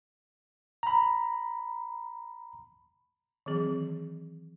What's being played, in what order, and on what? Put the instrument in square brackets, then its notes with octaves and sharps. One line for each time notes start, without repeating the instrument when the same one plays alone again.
[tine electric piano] A#5 B5
[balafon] D#3 E3 F#3 C4 G#4